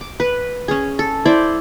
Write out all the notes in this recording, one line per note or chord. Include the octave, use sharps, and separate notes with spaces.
D6
B4
C#4 G#4
A4
E4 C5 D5